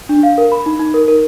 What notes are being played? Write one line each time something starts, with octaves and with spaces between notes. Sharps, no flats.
D4
F5
A#4
B5
D#4
D#4
A#4
A#4